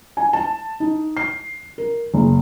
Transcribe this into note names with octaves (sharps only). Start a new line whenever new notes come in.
G#5
A5
D#4
C7
A#4
F#1